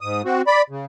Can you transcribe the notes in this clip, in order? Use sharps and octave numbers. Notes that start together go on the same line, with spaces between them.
G#2 D#6
C4 F#4
D5 B5
C#3